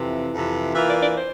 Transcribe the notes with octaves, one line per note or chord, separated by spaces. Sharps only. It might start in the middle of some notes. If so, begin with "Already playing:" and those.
Already playing: F2 C3 E3
F2 C3 E3
E3 A#3 F4 E5
D5
D5
C5